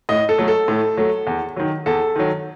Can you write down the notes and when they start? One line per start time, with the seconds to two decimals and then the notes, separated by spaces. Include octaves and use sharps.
0.09 A2 D#5
0.29 A4
0.38 F#3 A3
0.48 A4
0.68 A2
0.97 F#3 A3
1.27 E2
1.56 D#3 F#3
1.86 E2 A4
2.16 D#3 F#3